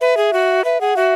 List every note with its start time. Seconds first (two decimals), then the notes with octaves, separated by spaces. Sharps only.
0.01 B4 E5
0.17 G#4
0.33 F#4
0.64 B4 E5
0.81 G#4 F#5
0.96 F#4 E5